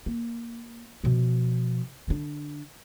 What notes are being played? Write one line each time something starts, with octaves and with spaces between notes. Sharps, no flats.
A#3
B2 F3
D3 D4